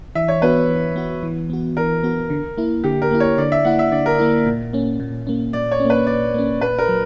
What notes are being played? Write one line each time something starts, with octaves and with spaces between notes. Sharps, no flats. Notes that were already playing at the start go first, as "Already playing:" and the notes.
E3 E5
C#5
B3 F#4 B4
E3
B3 F#4
E3
B3 F#4
E3 A#4
B3 F#4
D3
A#3 E4
D3 G4
A#4
A#3 E4
C#5
D3 D5
E5
A#3 E4 F#5
E5
D3 D5
A#4
A#3 E4
A#2
A#3 C#4
A#2
A#3 C#4
A#2 D5
C#5
C#4
A#3 B4
A#2 D5
A#3 C#4
A#2 B4
A#4
F#3